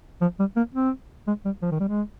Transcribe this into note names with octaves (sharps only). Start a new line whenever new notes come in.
F3
G3
A#3
C4
G#3
G3
F3
D#3
G3
G#3